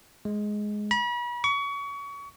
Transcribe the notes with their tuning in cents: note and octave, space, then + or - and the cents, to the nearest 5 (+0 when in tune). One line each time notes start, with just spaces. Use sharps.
G#3 +10
B5 -40
C#6 +30